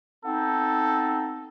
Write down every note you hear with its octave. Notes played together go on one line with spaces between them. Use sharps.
B3 C4 D#4 A4